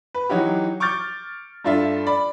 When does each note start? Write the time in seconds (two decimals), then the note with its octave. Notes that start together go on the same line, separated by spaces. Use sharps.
0.14 B4
0.29 E3 F#3 D#4 F#4 G4
0.80 C#6 D6 F6 G6 A6
1.65 G2 D4 F4 A4 E5
2.07 D5 B5